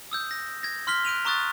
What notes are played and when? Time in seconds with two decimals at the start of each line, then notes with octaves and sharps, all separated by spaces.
0.11 D#6 E6 G6
0.31 A#6
0.63 G#6 A#6
0.87 C6 F6 B6 G7
1.05 F#6 D7 D#7 F7
1.25 A#5 C#6 D#6 F#6 A6